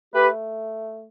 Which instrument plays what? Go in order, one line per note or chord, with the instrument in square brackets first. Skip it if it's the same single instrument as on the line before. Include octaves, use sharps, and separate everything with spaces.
[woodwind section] A3 G4 B4